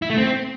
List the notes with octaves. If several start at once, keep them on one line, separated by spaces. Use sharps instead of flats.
E4
A3
C4